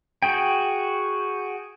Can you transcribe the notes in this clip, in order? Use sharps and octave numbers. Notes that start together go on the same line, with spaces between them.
F#4 G#4 G5